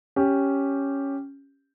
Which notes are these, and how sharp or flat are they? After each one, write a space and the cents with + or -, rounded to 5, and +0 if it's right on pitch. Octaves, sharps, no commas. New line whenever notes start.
C#4 +0 G4 +0